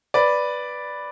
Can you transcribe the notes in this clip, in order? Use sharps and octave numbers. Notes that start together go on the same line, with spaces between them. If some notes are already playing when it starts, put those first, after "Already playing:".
B4 D5